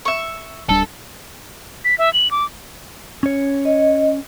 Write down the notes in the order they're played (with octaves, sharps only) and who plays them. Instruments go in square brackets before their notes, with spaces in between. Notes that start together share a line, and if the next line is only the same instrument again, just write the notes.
[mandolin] E5 C#6
[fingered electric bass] D1 G3 D4 [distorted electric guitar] A4
[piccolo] B6
E5
F#7
D6
[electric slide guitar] C#4 C#5
[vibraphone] D#5